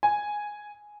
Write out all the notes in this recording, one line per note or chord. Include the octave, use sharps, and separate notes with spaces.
G#5